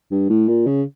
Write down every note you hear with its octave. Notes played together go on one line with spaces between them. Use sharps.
G2
A2
A#2
C#3